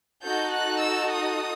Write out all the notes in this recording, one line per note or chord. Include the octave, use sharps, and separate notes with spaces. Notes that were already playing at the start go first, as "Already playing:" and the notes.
D#4 F#4 A4 G6
F#6
E6
D#6